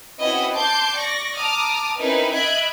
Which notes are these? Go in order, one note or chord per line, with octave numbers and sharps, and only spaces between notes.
C4 C#4 E4 F#4 B4 D#5
A5 C6 D6 G6
D5 C#6 A#6
A5 A#5 D6 D#6 F6
C4 C#4 D#4 E4 A#4 B4
D#5 E5 B5 F#6 G#6 D7